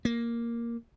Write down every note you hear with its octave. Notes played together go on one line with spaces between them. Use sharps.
A#3